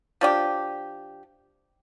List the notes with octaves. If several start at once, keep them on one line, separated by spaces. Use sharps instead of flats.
F3 D4 G4